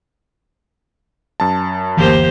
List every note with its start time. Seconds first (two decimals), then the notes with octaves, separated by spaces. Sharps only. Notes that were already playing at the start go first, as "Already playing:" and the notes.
1.40 F#2 A5
1.97 F#1 D2 E3 A#3 G4 C5